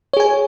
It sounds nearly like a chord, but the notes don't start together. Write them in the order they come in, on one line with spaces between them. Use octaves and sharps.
C#5 G#4 G#5